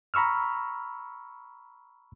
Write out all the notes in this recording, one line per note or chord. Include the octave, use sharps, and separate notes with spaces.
A#5 B5 C#6 E6 F6